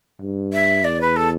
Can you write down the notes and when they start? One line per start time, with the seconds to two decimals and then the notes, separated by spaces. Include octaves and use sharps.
0.21 G2
0.53 E5
0.84 E2 D5
1.01 B4
1.16 A4